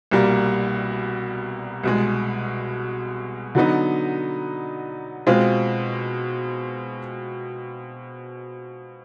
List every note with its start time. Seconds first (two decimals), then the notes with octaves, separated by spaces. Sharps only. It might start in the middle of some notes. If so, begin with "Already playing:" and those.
0.11 C2 B2 G3 A#3
1.83 C2 B2 G#3
3.55 D3 F#3 B3 D#4
5.27 B2 G#3 C4 F4